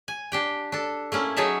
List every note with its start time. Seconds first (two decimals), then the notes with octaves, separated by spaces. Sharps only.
0.08 G#5
0.32 D4 G4 G5
0.72 D4 A4
1.12 A3 A#3 C#4 E4
1.37 F#3 D#4 G#4 C#5 E5 A5